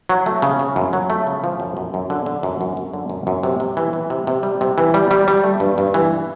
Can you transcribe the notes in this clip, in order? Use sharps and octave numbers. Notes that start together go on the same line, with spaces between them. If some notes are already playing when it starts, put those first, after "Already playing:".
F#3
A3
C#3
C#3
F#2
F#3
A3
C#3
F3
F#2
F#2
F#2
D3
D3
F#2
F#2
F#2
D3
F#2
F#2
C3
C3
E3
E3
C3
C3
G3
C3
E3
G3
G3
G3
A3
G2
G2
E3